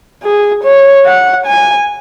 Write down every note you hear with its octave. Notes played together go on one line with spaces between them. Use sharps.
G#4
C#5
F#5
G#5